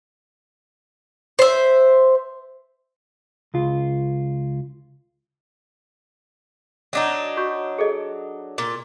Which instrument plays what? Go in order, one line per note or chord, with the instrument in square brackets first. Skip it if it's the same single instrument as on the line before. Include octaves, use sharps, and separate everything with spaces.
[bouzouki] C5 E5
[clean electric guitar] C#2 F4
[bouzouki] F#3 D4 D#4
[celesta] F#4 C#6 G6
G#4 A4 D#5
[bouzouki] A#2